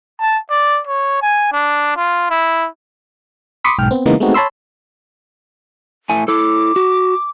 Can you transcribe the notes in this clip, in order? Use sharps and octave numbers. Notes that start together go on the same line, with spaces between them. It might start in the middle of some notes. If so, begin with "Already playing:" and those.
A5
D5
C#5
G#5
D4
F4
E4
B5 C6 D6 D#6 B6 C#7
B1 G#2 G5 F6
B3 C4
C#3 E3 G#3 A#3 B3 D#4
G#3 A3 B3 C4 D#4 F#4
C#5 A5 B5 C6 E6
A2 A3 G#5
E4 A4 D6
F#4